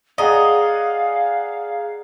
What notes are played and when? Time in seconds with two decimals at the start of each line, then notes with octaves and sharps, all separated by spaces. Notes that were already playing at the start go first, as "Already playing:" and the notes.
0.18 G#4 D5 D#5 F5 F#5 A#5